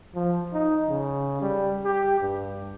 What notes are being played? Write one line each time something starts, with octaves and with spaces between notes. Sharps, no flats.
F3
D#4
C#3
G3
G4
G2